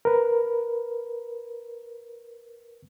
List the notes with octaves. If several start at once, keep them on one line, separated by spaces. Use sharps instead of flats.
A#4 B4